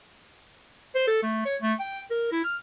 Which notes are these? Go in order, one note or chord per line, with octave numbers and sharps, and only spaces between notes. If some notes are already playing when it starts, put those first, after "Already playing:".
C5
A4
A3
C#5
A3
G5
A#4
E4
F6